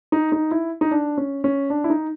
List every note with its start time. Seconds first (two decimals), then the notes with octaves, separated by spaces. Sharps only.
0.12 D#4
0.32 D#4
0.51 E4
0.81 D#4
0.91 D4
1.17 C#4
1.44 C#4
1.70 D4
1.84 E4
1.90 D#4